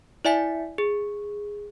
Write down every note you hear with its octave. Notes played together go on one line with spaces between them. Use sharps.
E4 D5 E5 G#5 B6
G#4